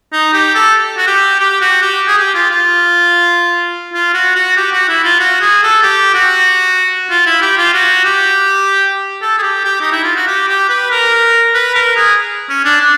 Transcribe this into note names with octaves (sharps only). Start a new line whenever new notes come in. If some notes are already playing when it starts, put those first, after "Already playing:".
D#4
G4
A4
F#4
G4
G4
F#4
G4
G#4
G4
F4
F4
F4
F#4
F#4
G4
F#4
E4
F4
F#4
G#4
A4
G4
F#4
F4
E4
G4
F4
F#4
G4
A4
G#4
G4
G4
D#4
E4
F4
F#4
G4
G4
B4
A#4
B4
A#4
G#4
C#4
D4
D4